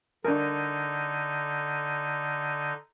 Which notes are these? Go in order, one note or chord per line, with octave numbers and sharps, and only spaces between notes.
D3 D4 D#4 A#4